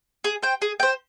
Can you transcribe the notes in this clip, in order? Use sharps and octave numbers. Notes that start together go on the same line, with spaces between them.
G#4
C5 G5
G#4
C5 G5